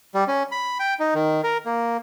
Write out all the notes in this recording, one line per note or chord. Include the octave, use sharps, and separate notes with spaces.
G3
C#4
B5
G5
D#4
D#3
A#4
A#3